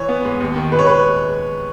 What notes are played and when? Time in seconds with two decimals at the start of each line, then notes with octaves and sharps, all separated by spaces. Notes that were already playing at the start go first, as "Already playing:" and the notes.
Already playing: E3 C#5
0.09 B3
0.25 G#2
0.40 D#2
0.56 D#3
0.72 G#3 B4
0.79 C#5
0.87 G#3 B4